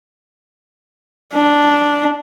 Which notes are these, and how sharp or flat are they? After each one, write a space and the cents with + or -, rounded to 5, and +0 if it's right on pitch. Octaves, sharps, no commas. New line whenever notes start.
D4 -5